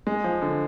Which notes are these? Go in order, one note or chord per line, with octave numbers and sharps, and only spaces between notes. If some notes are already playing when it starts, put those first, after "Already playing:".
G#3
F3
D3